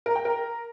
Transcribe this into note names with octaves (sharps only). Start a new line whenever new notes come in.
A#4
G5
A#4